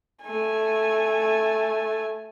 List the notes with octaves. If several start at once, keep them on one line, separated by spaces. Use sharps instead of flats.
A3 G#5